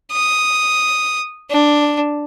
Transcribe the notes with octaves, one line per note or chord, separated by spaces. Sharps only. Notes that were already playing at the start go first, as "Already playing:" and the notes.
D#6
D4